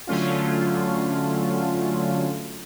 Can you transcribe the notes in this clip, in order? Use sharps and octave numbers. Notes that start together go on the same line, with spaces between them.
D3 F#3 A3 C#4 F4